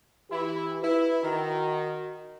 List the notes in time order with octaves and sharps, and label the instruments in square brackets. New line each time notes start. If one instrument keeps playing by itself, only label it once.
[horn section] E3 E4 [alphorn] G4
[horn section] E4 [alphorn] B4
[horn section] D#3 [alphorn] F#4